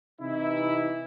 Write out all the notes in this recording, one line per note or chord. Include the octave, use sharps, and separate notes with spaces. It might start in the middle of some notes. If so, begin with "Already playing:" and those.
C3 E3 D#4 E4